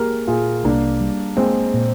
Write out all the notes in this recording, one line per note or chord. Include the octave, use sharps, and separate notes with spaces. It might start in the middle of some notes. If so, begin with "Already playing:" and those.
Already playing: A#3 G4 G#4 A#4
A#2 F4 G#4
C2 A#3 D4
G3
G#3 A#3 C4
A#2